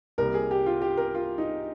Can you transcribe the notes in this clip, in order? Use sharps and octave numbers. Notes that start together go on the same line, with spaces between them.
C2 C3 G3 A#3 A#4
G#4
G4
F4
G4
A#4
F4
D#4